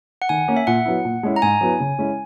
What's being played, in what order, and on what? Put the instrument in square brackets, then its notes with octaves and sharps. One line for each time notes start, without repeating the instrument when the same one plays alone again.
[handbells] F#5
[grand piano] D#3 [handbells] G#5
[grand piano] A#3 C#4
[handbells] E5
[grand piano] A#2 [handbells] F#5
[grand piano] F#3 B3 E4
A#2
G#3 C#4 E4
[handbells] A#5
[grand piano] G#2 [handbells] G#5
[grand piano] F#3 B3 E4
C#3
G#3 C#4 E4